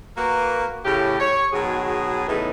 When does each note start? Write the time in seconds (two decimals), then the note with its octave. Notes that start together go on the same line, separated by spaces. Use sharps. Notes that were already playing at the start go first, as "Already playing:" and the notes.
0.17 A#3 F#4 B4
0.85 A2 C#3 G4
1.20 C#5
1.52 B2 D#3 F#3 G#4
2.28 A2 C#3 E3 A3 B3 D#4